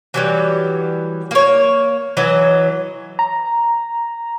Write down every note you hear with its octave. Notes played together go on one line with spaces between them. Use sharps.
E3 F#3 G3
A#3 C#5
E3 F#3 D#5
A#5